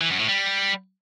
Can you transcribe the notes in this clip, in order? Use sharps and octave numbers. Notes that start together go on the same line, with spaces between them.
E3
F#2
A2
G3